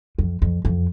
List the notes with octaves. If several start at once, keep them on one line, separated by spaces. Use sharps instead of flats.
F2
F2
F2